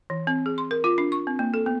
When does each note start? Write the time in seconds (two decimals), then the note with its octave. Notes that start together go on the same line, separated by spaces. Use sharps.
0.10 E3
0.27 C4
0.46 G#4
0.58 C6
0.71 A#4
0.84 F4
0.98 D4
1.12 C#6
1.27 C4
1.39 A#3
1.54 A4
1.66 B3